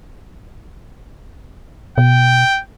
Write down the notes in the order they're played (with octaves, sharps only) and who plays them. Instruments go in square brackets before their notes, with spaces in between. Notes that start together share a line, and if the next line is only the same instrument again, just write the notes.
[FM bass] B2 [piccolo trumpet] G5